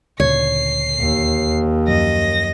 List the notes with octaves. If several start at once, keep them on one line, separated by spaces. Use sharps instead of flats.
D2 A#2 C#3 C#5 C7
D#2
F#2 F3 D#5 A#6